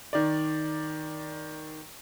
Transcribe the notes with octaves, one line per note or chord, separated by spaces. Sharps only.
D#3 D5